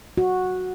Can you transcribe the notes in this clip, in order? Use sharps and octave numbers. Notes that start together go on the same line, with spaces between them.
F#4